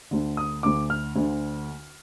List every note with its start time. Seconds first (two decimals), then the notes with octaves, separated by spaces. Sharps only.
0.11 D2 D3
0.37 D#6
0.63 D2 D3 D6
0.90 F6
1.16 D2 D3